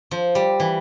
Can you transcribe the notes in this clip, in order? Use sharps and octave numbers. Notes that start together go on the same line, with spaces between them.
F3
G3
E3